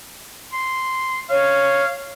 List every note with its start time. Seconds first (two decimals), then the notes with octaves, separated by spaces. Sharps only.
0.53 C6
1.30 C#5 F5